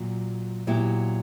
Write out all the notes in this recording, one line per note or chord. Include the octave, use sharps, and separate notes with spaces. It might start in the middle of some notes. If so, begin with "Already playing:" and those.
Already playing: A#2 F#3
A#2 F#3 B3 E4 G4